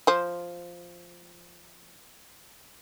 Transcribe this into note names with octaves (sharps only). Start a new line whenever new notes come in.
F3 C5